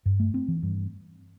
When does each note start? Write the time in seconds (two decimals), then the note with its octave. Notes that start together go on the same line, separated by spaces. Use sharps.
0.06 G2
0.20 A3
0.34 C4
0.48 E3
0.63 G2